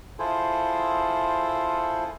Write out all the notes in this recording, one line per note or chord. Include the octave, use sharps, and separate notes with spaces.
E4 F4 G#4 A4 C5